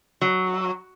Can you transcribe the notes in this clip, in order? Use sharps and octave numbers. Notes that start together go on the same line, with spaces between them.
F#3